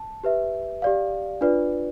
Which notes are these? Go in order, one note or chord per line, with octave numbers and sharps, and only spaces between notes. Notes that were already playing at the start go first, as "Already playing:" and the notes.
Already playing: A5
G4 B4 E5
G4 D5 F5
D4 F4 B4 D5